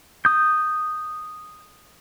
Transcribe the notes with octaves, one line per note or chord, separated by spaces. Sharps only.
D#6 G6